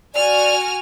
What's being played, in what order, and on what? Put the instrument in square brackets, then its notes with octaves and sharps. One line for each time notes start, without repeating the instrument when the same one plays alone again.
[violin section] F#4 G#5 F6 [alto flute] D5